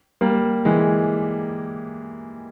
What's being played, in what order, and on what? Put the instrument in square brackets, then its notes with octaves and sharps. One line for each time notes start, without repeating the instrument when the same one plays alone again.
[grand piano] G3 A#3
E3 G#3